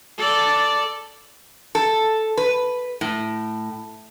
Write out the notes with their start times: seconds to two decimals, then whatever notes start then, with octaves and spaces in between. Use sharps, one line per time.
0.18 A4 D5
1.75 A4
2.37 B4
3.01 A2